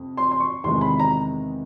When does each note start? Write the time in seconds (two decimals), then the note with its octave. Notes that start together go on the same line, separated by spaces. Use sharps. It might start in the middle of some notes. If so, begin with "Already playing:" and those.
Already playing: F2 C3
0.17 C6
0.31 C6
0.40 C#6
0.64 E2 C3 D#3 G#3 C6
0.81 B5
1.00 A#5